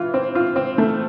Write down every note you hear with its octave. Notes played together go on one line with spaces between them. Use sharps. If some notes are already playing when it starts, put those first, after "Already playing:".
Already playing: E3 F4
C4
F4
C4
A3